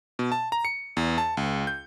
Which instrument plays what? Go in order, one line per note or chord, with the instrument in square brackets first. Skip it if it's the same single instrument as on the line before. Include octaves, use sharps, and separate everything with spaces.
[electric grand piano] B2
A5
A#5
C#7
E2
A5
C#2
G6